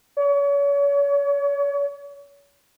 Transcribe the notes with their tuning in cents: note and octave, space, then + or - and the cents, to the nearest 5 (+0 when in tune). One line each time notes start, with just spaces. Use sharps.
C#5 +35